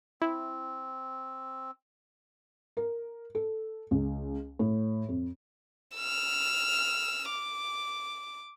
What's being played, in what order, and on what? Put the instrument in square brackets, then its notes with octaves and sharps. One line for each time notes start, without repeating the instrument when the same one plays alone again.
[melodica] C4 [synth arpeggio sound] E4
[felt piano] A#4
A4
C#2
A2
F2
[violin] E6 F6
D6